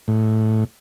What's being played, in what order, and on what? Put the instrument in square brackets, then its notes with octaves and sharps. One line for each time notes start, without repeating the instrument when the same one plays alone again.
[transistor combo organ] A2